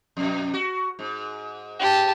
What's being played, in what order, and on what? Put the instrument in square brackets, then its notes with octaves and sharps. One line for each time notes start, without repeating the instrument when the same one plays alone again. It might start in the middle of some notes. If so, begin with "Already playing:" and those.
[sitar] F2 B2
F#4
G#2
[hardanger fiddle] G4 A5